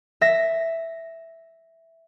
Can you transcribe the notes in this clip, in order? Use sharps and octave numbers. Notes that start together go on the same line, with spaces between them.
E5 A#6